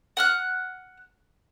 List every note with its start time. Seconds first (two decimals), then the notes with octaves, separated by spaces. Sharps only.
0.17 F#5 F6 F#6